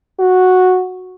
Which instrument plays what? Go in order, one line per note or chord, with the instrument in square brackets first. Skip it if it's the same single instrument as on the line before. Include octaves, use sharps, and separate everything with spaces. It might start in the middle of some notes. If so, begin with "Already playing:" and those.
[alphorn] F#4